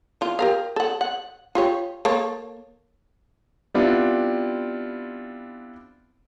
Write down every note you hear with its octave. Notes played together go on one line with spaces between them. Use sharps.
E3 F4
G4 A#4 F5
A4 F#5
F#5
F4 G4 C#5
A#3 A4 C#5
G3 B3 C4 D4 E4 F4